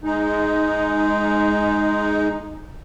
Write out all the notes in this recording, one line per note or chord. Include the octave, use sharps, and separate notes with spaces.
G#3 D#4